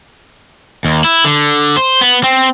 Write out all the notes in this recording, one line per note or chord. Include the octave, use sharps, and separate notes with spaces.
D#2
E4
D3
C5
B3
C4